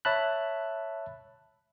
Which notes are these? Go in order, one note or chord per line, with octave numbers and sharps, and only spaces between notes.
C#5 E5 A5 B5 F#6